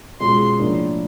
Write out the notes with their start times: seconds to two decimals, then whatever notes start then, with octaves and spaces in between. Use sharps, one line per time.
0.20 B2 G#3 C#4 F4 C6
0.59 A2 F3 A#3 D4